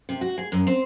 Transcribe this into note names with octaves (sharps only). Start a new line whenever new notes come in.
C3
F#4
G#4
F#2
C4